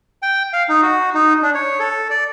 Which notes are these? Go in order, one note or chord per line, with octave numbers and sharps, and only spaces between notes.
G5
F5
D#4
F#4
D#4
D4
C#5
A4
D5